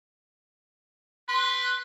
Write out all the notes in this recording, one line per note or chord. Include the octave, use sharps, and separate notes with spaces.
B4 C6